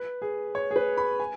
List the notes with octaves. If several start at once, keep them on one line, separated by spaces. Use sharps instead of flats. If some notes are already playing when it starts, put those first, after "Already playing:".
Already playing: B4
G#4
C#5
G#4
B4
B5
G#5